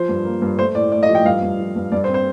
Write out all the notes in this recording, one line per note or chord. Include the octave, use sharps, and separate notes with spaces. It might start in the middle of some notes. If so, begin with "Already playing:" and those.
Already playing: F3 C5
G2
A#3
G2
A3 C5
A2 D5
A3 D5
D#5
F3
G5
G2 F5
G2
F3
G2
G2 D5
C5
C4
C5